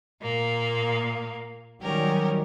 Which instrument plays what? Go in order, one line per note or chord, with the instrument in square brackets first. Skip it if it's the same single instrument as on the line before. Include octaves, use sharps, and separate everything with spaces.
[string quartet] A#2 A#3
[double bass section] D#3 F#3 G3 [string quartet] C#4 G4 A#4